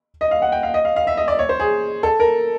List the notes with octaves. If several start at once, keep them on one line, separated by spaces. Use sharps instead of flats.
D#5
F5
F#5
G5
F5
D#5
F5
F5
E5
D#5
D5
C#5
C5
G#4
A4
A#4